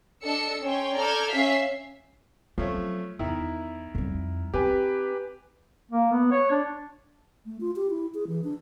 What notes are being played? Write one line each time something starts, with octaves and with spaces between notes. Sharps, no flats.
D4 A4 D#5 E6 C#7
C#4 C#5 G5 C6
A4 D5 A#5 F6 G6 G#6
C#4 E5 F5 B6 C7
F3 F#3 A3 C4 C#4
E2 D#3 E4
F2 G3
C4 G4 B4 G#5
A#3
B3
C#5
D4
A3
F4
G4
E4
G#4
E3
D4